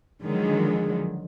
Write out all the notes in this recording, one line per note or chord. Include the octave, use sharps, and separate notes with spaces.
D3 D#3 F3 F#3 G#3